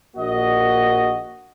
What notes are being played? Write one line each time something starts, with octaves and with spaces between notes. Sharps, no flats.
A#1 A#3 F#4 D#5